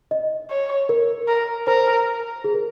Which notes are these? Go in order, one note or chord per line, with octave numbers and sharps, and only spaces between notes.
D#5
C#5
A#4
A#4
A#4 C5
G#4
A#4